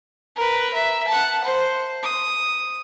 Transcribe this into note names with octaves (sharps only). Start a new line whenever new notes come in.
A#4 B4
E5
F#5 A5
C5
D#6